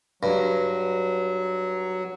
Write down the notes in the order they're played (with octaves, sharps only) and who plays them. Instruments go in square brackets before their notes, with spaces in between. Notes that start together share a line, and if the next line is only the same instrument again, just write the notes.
[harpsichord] G2 [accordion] F#3